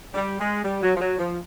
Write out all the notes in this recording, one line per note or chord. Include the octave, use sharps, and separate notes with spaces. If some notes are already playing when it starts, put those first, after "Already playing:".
G3
G#3
G3
F#3
F3
F#3
F3